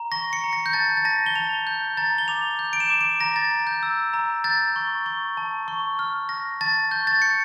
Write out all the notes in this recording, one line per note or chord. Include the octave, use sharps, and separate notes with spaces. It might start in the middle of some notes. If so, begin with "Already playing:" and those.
Already playing: A#5
C#6 A#6
C#7
A#5
A#6
G6
A5 A6
A6
A5 A#6
G7
A5 F7
G6
A#5 A6
G7
D6 F7
G6
D7
E7
D6
D7
A#5 A#6
A6
A#5
G6
E6
A#5
G6 A6
C#6
C#6
A5
C#6
F6
F6 A#6
A5 A6
C#6 G6
A6
G6 C#7